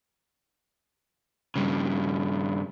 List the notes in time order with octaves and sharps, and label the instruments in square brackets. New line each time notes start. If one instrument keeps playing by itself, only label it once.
[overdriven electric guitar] G2 C#3